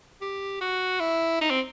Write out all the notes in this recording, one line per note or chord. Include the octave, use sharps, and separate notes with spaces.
G4
F#4
E4
D#4
C4